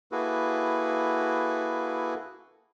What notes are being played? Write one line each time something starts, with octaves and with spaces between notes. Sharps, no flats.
A#3 E4 F#4 G#4 A4 B4